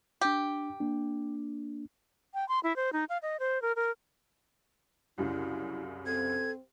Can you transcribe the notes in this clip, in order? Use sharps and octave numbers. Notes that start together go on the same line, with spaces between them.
D4 G4 G5
A#3 D4
G5
C6
E4
C5
D#4
F5
D#5
C5
A#4
A#4
C2 F#2 C#3 E4
C4 A4 G#6